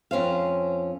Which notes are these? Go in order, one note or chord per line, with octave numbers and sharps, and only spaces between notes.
F2 C#4 C5 F5